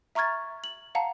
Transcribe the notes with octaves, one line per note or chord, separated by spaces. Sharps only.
E5 A#5 C#6 F6 G#6 A6
F#7
F5 F#5 A5 A#5